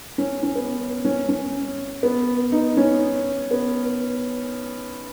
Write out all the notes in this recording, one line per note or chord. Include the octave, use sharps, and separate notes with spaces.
C#4
C#4
B3
C#4
C#4
B3
D#4
C#4
B3